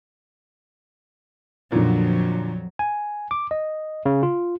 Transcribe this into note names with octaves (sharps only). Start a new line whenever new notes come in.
F2 A#2 D3 F#3
G#5
D6
D#5
C#3
F4